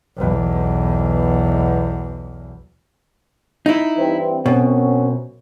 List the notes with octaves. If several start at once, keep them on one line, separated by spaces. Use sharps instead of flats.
B1 E2
D#4 E4
G2 E3 C4
F#2 B2 C4 C#4